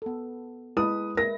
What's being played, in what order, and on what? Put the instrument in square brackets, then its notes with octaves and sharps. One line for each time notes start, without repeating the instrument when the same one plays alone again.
[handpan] B3 A4
[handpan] G#3 B4 [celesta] E4 [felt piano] D#6
[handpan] E4 [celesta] A#4 [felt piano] A#6